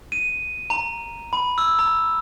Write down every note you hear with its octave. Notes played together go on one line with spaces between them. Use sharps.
D#7
A#5
B5
E6
A#5